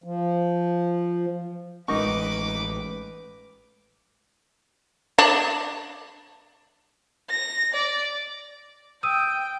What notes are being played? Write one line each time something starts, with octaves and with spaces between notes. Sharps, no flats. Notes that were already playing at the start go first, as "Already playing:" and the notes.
F3
A1 G#3 C#4 D#4 A#4 B4 C#6 D6
D4
A#6
D5
G5 D#6 E6 D#7